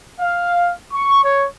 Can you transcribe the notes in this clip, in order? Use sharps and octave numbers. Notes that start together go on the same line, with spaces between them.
F5
C#6
C#5